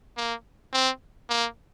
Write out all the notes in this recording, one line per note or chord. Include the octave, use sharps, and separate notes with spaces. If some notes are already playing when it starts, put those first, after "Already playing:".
A#3
C4
A#3